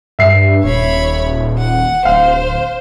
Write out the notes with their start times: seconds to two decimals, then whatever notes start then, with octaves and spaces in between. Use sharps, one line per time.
0.19 G2 E5 C7
0.64 D#1 C#5 B5
1.58 F#5
2.05 D1 C5 F5